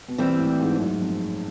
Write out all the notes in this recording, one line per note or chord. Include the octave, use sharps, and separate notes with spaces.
B2
A#2 E3 G3 C4
A2
G#2
F#2
F2